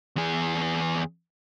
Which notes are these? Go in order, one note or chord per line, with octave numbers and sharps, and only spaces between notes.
E2 G#4